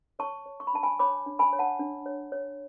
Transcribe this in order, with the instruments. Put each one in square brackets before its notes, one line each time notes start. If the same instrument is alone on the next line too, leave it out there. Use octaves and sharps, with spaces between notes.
[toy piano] C#5 A5 C#6
C#5
C#6
B5
D4 A5
G#5 B5
C#5 B5 D6
D4
G#5 B5
C#5
F#5 A5
D4
C#5
C#5